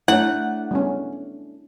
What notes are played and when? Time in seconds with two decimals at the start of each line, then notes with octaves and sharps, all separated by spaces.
0.08 A3 D4 E4 C#5 F#5
0.71 G3 B3 C#4